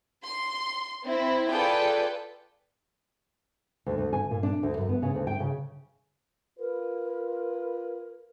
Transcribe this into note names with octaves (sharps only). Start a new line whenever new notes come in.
C6
C4 E4
F4 G#4 A4 B4 D5 G5
D2
D2
G#5
A#2
D4
D2
F#2
B3
C#3
D2
G5
C#3
F4 A#4 B4